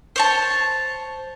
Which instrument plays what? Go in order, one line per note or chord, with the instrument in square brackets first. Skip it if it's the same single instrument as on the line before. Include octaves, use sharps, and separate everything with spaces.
[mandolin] C5 C#5 A5